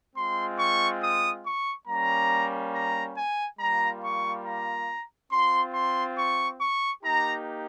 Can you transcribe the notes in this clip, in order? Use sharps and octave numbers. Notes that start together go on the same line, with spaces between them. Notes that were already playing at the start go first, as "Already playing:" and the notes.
G#3 C4 F4 C6
C#6
D#6
C#6
G3 A#3 C#4 A#5
A#5
G#5
G3 A#3 F4 A#5
C#6
A#5
C4 F4 C6
C6
C#6
C#6
A#3 D#4 G4 A#5